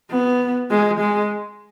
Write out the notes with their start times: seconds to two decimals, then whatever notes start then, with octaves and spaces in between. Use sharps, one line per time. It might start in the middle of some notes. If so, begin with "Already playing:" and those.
0.10 B3
0.70 G#3
1.00 G#3